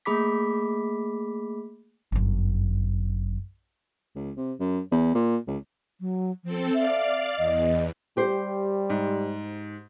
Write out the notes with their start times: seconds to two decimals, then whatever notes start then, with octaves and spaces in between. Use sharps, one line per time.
0.05 A3 A#3 G#4 B5 D6 B6
2.12 G1 F#2
4.15 C#2
4.36 C3
4.60 F#2
4.91 E2
5.14 A#2
5.47 C#2
6.00 F#3
6.44 F3 C4 A4
6.74 D5 E5 F5
7.38 E2 D#5
8.17 G3 G4 C5
8.90 G#2